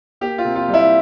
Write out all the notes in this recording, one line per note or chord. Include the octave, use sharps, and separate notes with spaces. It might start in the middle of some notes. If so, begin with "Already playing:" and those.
A#3 G4
F4
C3
F4
G3
E4